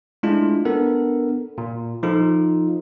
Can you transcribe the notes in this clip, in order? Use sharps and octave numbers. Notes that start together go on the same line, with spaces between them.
G#3 A3 D4 E4 F4
B3 D4 A4 A#4
A#2
F3 D#4 F4 A4